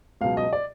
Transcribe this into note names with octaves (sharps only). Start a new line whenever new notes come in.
C#2 B2 F#3 F5
D#5
D5